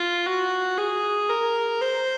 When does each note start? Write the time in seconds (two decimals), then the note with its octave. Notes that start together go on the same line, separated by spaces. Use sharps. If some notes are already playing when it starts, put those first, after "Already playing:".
Already playing: F4
0.26 F#4
0.77 G#4
1.29 A#4
1.81 C5